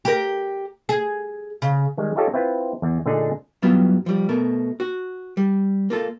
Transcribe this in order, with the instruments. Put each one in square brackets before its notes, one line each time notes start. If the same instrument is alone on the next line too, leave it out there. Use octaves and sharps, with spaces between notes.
[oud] G4 A#4
G#4
C#3
[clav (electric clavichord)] D#3 G3 G#3
D#4 F4 G4 A4 C#5 D#5
C4 E4 F4 B4
E2
A#2 D3 A3 D4 D#4 G#4
[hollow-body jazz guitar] G2 F#3 B3 E4 F4 E5
F3 G3
B2 A3 A#4
F#4
G3
A#3 F4 A4